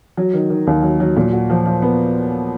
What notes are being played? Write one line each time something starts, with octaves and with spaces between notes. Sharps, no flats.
F#3
D#3
D#3
D#2
F#3
F#3
A#2
F#4
F3
F3
B3